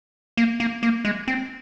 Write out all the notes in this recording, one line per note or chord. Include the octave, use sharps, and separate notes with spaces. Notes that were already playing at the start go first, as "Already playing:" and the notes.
A#3
A#3
A#3
G#3
C4